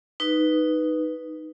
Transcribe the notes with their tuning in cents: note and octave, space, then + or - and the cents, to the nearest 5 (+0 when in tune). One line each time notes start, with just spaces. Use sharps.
D#4 +0 B4 +0